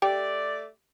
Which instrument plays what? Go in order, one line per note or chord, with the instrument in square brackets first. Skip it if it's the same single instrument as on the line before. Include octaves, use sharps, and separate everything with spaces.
[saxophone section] A3 D5 [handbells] G4 G5